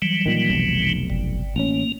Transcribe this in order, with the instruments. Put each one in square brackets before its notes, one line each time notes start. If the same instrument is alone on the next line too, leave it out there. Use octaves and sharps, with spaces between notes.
[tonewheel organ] E3 F#3 G3
[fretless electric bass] A#2 D#3
F1 B1
[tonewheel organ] G1
[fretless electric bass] A1 C#4 [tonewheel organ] A#3